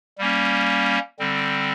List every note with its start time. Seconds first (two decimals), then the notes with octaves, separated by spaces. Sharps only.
0.18 G3 A#3 C#4
1.19 D3 G3 C4